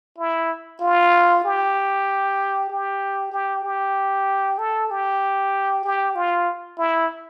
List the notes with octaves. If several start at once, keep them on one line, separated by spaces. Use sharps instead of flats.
E4
F4
G4
G4
G4
G4
A4
G4
G4
F4
E4